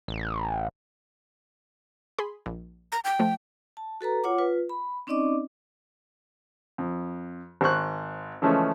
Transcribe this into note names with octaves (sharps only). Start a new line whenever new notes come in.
A1
G#4 B5 C6
A#1
A#5
G5
F3 A3
A5
F#4 A4 B4 A#5
F4 C#5 F#5 D6
F4 B4
B5
C4 C#4 D#4 D5 D#5 D6
F2
G#1 C5 C#6 F#6
C#3 E3 F3 G#3 A3 C#4